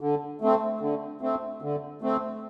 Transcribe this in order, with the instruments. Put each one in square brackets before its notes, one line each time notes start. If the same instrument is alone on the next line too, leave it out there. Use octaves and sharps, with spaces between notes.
[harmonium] D3
A3 C4
D3
A3 C4
D3
A3 C4